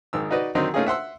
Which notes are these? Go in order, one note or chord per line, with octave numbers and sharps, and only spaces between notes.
G#1 D#3 E6
D#4 F#4 B4 D5 D#5
D3 D#3 F#3 C4 D#4
A3 A#3 C#4 D#4 F4 G#4
E5 F#5 C6 E6